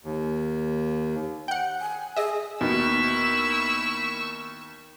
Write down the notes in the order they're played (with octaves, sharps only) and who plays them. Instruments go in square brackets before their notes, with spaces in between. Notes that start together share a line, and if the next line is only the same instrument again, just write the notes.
[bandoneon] D#2
[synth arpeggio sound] F#5 G5
[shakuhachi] G#5
[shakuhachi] G#4 [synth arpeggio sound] D#5 E5
[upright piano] D#2 [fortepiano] B2 [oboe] E4 [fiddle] C#6 E6